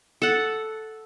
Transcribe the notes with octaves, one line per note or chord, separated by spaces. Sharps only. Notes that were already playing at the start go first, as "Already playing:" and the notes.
A4 F#5